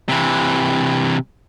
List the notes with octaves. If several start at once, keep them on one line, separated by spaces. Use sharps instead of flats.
C3 E3